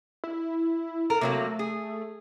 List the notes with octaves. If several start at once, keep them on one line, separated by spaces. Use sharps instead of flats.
E4
A4 A#4
C3 F#3 A3 A#3
G#4